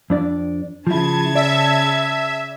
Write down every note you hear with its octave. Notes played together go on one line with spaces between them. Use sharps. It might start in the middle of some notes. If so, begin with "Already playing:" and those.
F2 D4 D5
C#3 F3 E4 A5 G#6
D5 E5